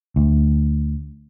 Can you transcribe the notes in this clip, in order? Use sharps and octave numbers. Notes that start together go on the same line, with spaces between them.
D2